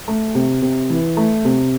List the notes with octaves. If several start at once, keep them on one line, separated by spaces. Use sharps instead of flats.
A3
C3
C3
E3
A3
C3